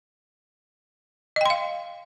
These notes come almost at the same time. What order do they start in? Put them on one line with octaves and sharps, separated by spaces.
D#5 G5 C6 F5